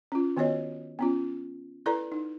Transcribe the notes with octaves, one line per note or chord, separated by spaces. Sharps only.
C#4 F4
D#3 B3 F#4 C#5 D#5
B3 C#4 F4
E4 A4 B4 D5 A#5
D#4